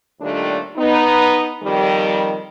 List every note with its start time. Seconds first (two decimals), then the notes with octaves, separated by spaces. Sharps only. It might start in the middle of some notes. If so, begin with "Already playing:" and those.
0.21 D#2 A#2 D#3 G3 A3 D4
0.77 B3 D#4
1.63 F2 D#3 G3